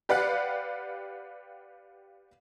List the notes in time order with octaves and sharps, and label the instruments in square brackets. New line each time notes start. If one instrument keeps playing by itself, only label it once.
[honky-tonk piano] G4 B4 D5 F5 F#5 F#6